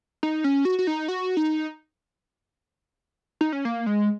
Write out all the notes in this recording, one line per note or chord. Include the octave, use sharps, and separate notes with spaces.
D#4
C#4
F#4
F#4
D#4
F#4
D#4
D#4
C#4
A#3
G#3